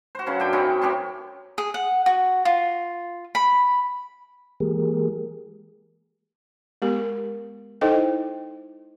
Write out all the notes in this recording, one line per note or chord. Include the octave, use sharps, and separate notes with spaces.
F#4 C5
C#3 F#3 C#4 B4
F#2 D4 G5
C4 C#4 D#4 E4
C4 C#4 G4 B4
G#4
F#5
F#4
F4
B5
E3 G#3 A#3 G4 G#4 A#4
G#3 B3 G4 A#4
D#4 E4 A4 C5 D#5 G5